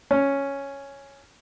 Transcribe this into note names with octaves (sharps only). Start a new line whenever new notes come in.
C#4